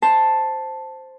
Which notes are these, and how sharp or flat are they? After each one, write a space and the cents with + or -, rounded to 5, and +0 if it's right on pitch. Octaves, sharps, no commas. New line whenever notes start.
C5 +0 A5 +0